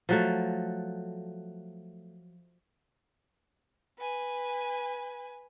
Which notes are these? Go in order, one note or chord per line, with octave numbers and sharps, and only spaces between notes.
F3 F#3 A3
B4 G#5